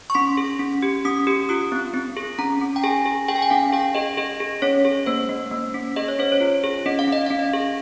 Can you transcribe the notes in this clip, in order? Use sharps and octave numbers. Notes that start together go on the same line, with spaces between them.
C#6
C#4 C6
G#4
C#4
G4
C#4 D#6
G4
F4 D#6
C4
C4
G#4
C#4 A#5
C#4
G5
G#4 G#5
G#4
G#4 G5
G#5
G5
C#4 F5
G#4 G5
G#4 D#5
G#4 D#5
G#4
C#4 C#5
G#4
A#3 C5
A#3
A#3
C#4
G#4 D#5
C#5
C#4 C5
C#5
F4
G#4
C#4 D#5
F5
C#4 D#5
C#4 F5
D#5
G#4